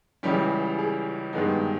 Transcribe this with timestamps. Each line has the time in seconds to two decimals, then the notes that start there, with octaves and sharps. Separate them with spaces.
0.23 C#2 C#3 E3 G3 C#4 G4
0.79 G#4
1.33 G2 D#3 G#3 B3 D#4